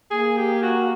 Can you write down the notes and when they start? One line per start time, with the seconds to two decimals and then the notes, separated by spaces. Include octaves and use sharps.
0.11 A#3 G#4
0.37 G4
0.63 F#4